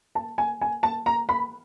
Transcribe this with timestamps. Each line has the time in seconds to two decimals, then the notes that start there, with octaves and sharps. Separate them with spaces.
0.15 A5
0.38 G#5
0.61 G#5
0.83 A5
1.06 A#5
1.29 B5